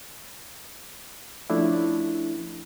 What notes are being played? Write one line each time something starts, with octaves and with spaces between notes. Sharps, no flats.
F3 A3 C#4 D4 E4